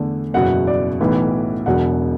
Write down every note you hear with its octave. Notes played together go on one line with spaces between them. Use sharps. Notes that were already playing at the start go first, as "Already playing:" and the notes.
Already playing: E2 D3 A3
F#1 E2 B2 F#3 F#5
D5
B1 A2 E3 B3
E1 E2 B2 F#3 F#5